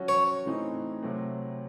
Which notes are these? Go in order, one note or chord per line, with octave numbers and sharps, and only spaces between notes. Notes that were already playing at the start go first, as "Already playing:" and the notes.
Already playing: F#3 C#4 F#4
C#5
A2 E3 A3 C4 D#4
C3 F#3 A3 C4